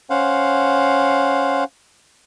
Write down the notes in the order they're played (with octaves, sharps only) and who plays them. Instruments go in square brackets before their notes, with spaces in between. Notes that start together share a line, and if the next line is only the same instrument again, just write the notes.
[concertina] C#4 C5 F5 F#5